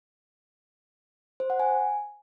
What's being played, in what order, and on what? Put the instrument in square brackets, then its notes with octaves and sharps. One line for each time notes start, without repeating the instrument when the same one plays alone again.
[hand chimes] C5
F#5
G#5